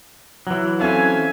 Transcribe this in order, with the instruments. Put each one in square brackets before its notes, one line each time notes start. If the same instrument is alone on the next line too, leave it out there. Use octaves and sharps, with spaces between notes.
[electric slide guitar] E3 F#3
[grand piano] C4 C#4 A4 [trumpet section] E5 F5 G#5